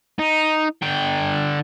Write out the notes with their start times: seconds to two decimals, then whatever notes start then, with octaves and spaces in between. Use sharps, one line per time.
0.19 D#4
0.83 D3 G5